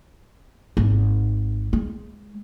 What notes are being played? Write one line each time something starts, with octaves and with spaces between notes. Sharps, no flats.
G#1
G#3